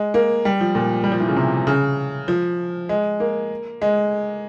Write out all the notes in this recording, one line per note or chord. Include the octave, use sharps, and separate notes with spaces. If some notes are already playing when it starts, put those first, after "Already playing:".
Already playing: G#3
A#3
G3
F3
A#2
G3
F3
E3
C#3
C3
C#3
F3
G#3
A#3
G#3